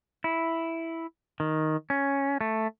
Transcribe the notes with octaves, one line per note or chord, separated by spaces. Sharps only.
E4
D#3
C#4
A3